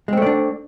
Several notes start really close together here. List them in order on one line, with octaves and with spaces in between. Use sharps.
G#3 C4 A3 D5 D4